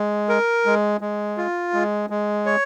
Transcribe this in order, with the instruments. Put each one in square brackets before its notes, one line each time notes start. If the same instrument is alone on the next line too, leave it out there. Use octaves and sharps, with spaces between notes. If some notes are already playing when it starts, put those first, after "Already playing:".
Already playing: [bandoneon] G#3
A#4
G#3
G#3
F4
G#3
G#3
C#5